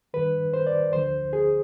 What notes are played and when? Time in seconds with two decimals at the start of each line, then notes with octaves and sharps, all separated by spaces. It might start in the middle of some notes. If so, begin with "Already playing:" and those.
0.14 G2 D#3 B4
0.53 C5
0.67 D5
0.93 D2 D3 F3 C5
1.33 G#4